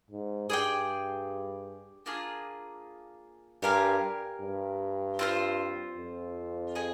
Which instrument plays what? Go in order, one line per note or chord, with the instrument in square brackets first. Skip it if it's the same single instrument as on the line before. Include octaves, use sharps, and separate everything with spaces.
[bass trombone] G#2
[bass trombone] G2 [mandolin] G#4 D5 G5
[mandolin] A#3 D4 F4 G#4
[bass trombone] G2 [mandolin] G4 A#4 F5 G#5
[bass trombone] G2
[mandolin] C4 F4 C5
[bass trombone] F2
[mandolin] G#4 D#5 G#5